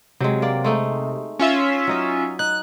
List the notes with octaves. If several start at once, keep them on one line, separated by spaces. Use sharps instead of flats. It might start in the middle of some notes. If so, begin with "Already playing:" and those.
C3 F#3 G#3
A#3 D5
G#3 A3 D#4
C#4 F4 E5
F#3 D#4 D#5
D#4 F#6